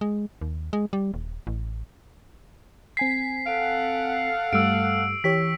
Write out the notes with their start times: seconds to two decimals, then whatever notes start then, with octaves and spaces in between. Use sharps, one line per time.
0.01 G#3
0.41 D#2
0.73 G#3
0.93 G3
1.14 D#1
1.47 A1
2.97 C4 G#5 B6 C7
3.47 A4 F5 F#5 D7
4.53 G2 G3 A3 E6 D7
5.24 E3 G4 C#5 B6